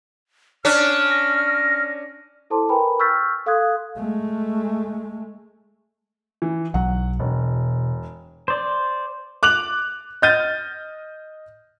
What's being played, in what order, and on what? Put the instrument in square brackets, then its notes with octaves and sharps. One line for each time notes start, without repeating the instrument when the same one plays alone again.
[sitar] C#4 D4 [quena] F6
[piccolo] A#6
[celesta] E4 A4 C5 A5 C6 D6
A#4 B4 G5 G#5 A#5 B5
C#6 E6 F6 G6 A6 B6
A4 F5 C6 D#6 F#6 G#6
[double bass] G#3 A3
[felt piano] E3
[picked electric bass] B1 F#3 [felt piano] F#5
[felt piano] E1 [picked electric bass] B2
[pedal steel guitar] C5 D5
[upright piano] D6 F#6 F7 F#7
D#5 F6 G6 A6 D#7